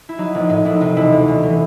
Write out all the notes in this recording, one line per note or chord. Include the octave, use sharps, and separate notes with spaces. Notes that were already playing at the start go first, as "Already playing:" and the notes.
E4
F#3 D#4
A#1
A2 D#4
A#1 E4
C3 D#4
E1 E4
D2
E1
E3